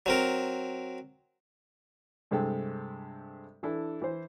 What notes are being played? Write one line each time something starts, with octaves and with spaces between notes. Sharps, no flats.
F#3 C4 A#4
G2 C3 G#3 A4 G5
E3 D4 E4 A4
E3 C5